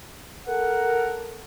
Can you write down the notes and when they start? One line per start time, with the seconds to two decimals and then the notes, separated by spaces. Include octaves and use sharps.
0.48 A4 A#4 F#5